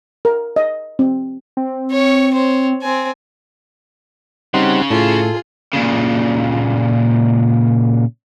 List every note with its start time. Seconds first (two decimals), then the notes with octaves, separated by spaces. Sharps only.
0.25 A#4
0.56 D#5
0.99 C4
1.57 C4
1.91 C#5 C#6
2.33 C5 C#5
2.82 C4 G#5
4.54 C#3 G3 C4 D#4 F#5 C6
4.90 A2 F4 G#4 A4
5.73 A#2 C#3